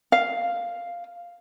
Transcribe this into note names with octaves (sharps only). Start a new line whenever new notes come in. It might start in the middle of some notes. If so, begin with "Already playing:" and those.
F5